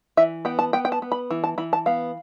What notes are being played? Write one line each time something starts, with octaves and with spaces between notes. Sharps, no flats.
E3 E5
B3 G5
A5
B3 G5
G5
A5
B3
B5
E3
A5
E3 B5
A5
B3 F5